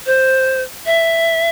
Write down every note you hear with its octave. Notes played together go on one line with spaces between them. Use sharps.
C5
E5